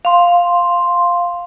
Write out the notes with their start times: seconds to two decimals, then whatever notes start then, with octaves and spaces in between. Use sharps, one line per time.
0.05 F5 C6